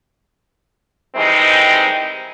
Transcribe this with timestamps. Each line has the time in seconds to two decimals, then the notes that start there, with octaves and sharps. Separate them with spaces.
1.15 D#3 E3 G3 G#3 C4 D#4